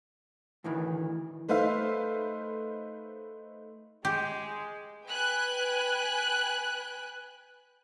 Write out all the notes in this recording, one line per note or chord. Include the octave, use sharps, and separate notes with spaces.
D2 A2 D#3 E3
A3 D#4 B4 C5 E5 F5
G#3 G4
B4 G5 G#5 F#6